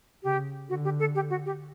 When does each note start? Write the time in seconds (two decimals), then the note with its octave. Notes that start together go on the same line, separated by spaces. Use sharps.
0.23 C#3 G4
0.69 D3 F#4
0.84 G4
0.99 A4
1.15 G4
1.30 F#4
1.46 G4